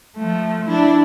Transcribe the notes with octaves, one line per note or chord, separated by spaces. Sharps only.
F3 A3
D4 E4